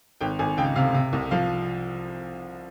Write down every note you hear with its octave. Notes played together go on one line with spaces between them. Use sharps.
G#1 G5
G#1 G#5
C#2 G5
C3 F5
C3
C2
F3 F5